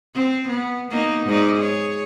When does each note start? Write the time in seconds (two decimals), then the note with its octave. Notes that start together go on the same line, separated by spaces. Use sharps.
0.15 C4
0.49 B3
0.90 A#3 B3 D#4
1.27 G#2 D#4 D5
1.57 G#4 C#5